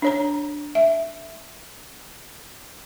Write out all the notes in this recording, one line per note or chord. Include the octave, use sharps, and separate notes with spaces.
D4 C#5 A#5
E5